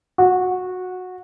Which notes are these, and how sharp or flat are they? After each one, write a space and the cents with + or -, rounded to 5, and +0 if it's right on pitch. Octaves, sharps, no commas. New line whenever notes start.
F#4 -15